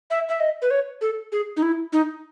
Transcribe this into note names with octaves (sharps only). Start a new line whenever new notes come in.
E5
E5
D#5
B4
C#5
A4
G#4
D#4
E4
D#4